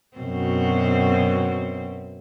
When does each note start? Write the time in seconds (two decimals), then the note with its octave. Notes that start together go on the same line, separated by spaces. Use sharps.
0.17 F#2 B2 C4